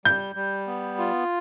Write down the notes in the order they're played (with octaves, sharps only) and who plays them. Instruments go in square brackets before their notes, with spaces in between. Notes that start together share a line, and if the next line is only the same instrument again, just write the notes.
[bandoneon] G3 [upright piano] G6
[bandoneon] G3
B3
F4